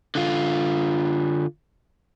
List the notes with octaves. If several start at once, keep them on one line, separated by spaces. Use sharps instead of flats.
D3 F4